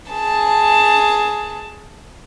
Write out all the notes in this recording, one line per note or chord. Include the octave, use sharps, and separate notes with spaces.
G#4 A5